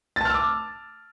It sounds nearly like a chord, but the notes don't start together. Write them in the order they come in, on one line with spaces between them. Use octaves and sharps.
A6 A5 F6 E6 D6